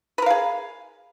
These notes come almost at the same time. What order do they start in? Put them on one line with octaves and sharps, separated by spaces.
B4 A#4 F5 G#4